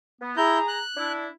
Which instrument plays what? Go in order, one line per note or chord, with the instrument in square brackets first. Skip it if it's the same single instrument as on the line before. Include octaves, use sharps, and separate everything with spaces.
[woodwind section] B3
[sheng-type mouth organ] E4 G6 [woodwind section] G#4 A#5
[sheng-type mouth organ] F#6
[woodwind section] D4 E4